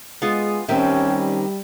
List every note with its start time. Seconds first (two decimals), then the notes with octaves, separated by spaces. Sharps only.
0.22 G#3 B3 F4 G#4
0.68 D#3 G3 C4 C#4 G4 E5